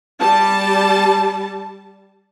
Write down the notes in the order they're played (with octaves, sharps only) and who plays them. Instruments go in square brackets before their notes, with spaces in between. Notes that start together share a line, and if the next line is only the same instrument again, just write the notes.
[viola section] G3 A5